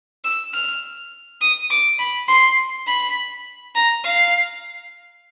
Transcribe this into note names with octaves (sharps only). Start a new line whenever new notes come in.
E6
F6
D#6
D6
B5
C6
B5
A#5
F5